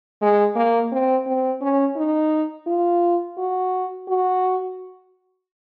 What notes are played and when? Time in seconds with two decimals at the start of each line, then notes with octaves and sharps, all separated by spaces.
0.22 G#3
0.56 A#3
0.92 C4
1.27 C4
1.61 C#4
1.96 D#4
2.67 F4
3.37 F#4
4.08 F#4